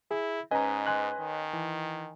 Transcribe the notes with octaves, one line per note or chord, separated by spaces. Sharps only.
E4 G#4
G#2 C#4 B4 D#5 G#5 A#5
G#5 C6 F#6
D#3
E3